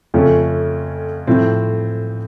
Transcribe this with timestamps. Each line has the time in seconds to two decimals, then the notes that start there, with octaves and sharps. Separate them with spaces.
0.14 F2 C#3 A3 C#4 F4
1.27 A2 F3 C4